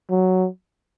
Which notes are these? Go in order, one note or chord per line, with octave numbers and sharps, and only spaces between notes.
F#3